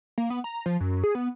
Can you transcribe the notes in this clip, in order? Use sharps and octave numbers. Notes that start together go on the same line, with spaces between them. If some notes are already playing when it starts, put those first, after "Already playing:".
A#3
B3
A#5
F3
F#2
G#4
B3